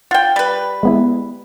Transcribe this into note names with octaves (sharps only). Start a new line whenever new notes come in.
F4 F#5 G5
G3 B4
G#3 B3 E4